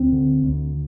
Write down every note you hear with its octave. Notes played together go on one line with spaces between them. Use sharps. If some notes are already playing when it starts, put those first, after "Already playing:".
Already playing: D2 C4
D3
D2